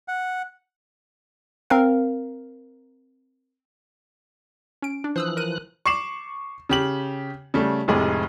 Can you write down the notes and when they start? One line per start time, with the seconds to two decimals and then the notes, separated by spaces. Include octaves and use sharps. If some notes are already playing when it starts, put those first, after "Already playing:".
0.08 F#5
1.70 C4 A#4 F5
4.82 C#4 D7
5.04 D4
5.16 E3 F3 C5 D#6 E6 F#6
5.37 A#4 D#7
5.86 C#6 D6 C7 E7 F#7
6.69 C#3 G4 F#7
7.54 C#3 G3 A3
7.88 F1 A2 C3 G#3 G#4